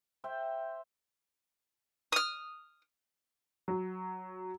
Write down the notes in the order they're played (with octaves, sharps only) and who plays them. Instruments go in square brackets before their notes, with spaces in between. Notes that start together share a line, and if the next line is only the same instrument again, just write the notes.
[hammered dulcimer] C5 E5 G5
[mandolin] D#6 F6
[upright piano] F#3